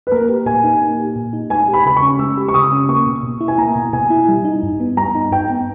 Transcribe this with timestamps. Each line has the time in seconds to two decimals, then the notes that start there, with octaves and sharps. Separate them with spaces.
0.07 B4
0.12 A#3 A#4
0.29 G4
0.46 A#2 G#5
0.64 D#4
0.82 A#3
0.99 G4
1.16 A#2
1.33 D#4
1.50 G#3 G#5
1.68 G4
1.73 B5
1.85 C#3 B5
1.97 C#6
2.02 C#4
2.19 G#3 E6
2.37 G4
2.48 C#6
2.54 C#3 D#6
2.72 C#4
2.89 A#3 C#6
3.07 B2
3.23 B2
3.41 E4
3.48 G#5
3.58 A#3 A#5
3.76 B2
3.93 B2 G#5
4.10 E4
4.28 G3
4.45 D#4
4.63 G2
4.80 B3
4.97 G3 A#5
5.15 D#4
5.32 G2 G5
5.50 B3